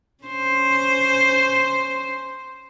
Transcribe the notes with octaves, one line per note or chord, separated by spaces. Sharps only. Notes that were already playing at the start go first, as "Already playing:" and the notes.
C#4 C5